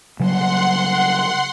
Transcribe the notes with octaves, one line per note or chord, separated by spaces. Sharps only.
C#3 F#3 G3 F#5 C6